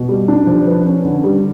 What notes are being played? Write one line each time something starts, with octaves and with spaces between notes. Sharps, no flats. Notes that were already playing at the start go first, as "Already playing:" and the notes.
Already playing: B2
G3
D4
F3
B4
C#4
D3
G3